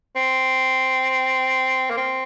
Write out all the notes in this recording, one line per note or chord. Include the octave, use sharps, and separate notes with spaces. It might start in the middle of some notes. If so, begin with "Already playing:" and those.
C4
A#3
C4